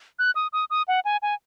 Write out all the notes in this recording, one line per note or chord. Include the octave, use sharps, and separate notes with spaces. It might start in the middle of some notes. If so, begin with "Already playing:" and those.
F#6
D#6
D#6
D#6
F#5
G#5
G#5